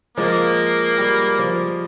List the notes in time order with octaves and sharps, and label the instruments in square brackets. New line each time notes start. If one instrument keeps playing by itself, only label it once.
[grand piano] F3 G#3 [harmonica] A#3
[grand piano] G3
F3